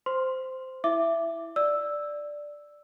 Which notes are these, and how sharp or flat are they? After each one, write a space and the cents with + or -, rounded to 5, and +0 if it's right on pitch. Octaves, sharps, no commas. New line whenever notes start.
C5 -10 C6 +0
E4 +0 E5 +15 D6 +0
D5 +0 E6 +0